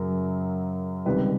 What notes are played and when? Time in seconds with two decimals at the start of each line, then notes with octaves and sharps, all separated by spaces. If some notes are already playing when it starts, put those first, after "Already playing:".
Already playing: F#2 C#3 F#3 A#4
1.05 C#2 C3 D#3 G3 B4